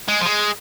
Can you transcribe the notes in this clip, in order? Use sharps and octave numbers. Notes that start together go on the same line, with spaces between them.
G#3
F3
G#3